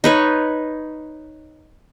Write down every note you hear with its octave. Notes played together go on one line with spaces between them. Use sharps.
D#4 B4 C#5